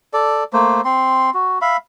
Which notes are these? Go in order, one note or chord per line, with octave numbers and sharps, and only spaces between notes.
A4 D5
A3 A#3 C5
C4 C6
F#4
E5 F5 B5